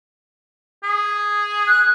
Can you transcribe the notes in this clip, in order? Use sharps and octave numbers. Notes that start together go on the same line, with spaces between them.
G#4
F#6